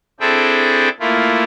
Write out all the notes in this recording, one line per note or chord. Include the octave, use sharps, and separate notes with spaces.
C4 D4 E4 G#4 A4 G5
A3 A#3 E4 F4